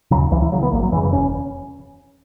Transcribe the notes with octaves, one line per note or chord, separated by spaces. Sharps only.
D#2 C#3 F#3
C#2 E3
E3
C#3 F#3
B3
G#1 A#3
F#3
F#2 C#3 E3
E3
E1 C#4